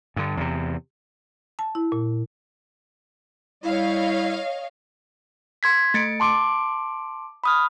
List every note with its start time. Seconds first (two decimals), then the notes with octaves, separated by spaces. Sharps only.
0.16 G2 D3
0.37 E2 C3
1.59 A5
1.75 E4
1.92 A#2
3.64 G3 E4 C#5 D#5 F5
5.63 C6 G#6 B6
5.94 A3 A6 C#7 D7
6.20 A5 C6 D6 D7
7.44 B5 D#6 F6